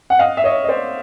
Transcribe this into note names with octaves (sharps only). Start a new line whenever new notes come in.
F#5
D#5 F5
E5
C#5 D#5
D#5
C5 D5